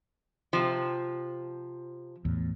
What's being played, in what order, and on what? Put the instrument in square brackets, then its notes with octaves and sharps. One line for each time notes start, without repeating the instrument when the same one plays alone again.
[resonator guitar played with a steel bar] C3 F3
[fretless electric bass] E2 A2